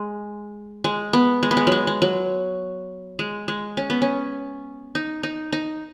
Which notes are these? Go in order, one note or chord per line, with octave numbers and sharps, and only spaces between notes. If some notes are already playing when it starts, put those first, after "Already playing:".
Already playing: G#3
G#3
B3
G#3
B3
G#3
F#3 G#3
G#3
F#3
G#3
G#3
C#4
B3
C#4
D#4
D#4
D#4